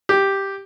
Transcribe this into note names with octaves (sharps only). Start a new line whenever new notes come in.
G4